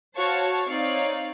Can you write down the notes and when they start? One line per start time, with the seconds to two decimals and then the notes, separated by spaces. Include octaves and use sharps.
0.17 F#4 C5 C#5 F5 A5 C#6
0.69 C4 D#4 C#5 D5 F5